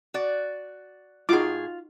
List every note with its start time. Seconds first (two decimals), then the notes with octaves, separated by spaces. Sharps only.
0.14 F#4 D5
1.29 A2 D#4 F4 F#4 G#4 D6